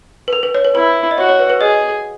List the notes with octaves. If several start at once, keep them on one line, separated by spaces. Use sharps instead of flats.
B4
A#4
B4
C#5
B4
E4 B4
D#5
F#4 C#5
C#5
B4
B4
G#4 D#5